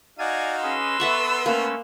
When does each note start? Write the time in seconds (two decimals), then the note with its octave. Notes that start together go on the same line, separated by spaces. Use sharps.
0.19 D#4 F#4 D5 F5 G#5 G#6
0.63 C#4 G#4 B4 D#5 C6 E6
1.00 B3 A4 E5 F#5 C#6
1.46 A3 A#3 C#4